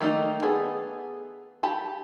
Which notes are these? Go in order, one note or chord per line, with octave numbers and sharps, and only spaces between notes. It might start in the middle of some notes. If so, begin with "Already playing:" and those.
D#3 A3 A#3 D#4
B3 G#4 A4
G4 A5 B5